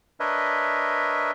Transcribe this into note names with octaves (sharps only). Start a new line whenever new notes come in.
D4 A#4 B4 C#5 D#5 E5